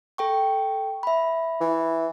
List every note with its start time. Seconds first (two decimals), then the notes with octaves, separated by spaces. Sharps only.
0.18 A4 G5 C#6
1.03 E5 B5
1.61 E3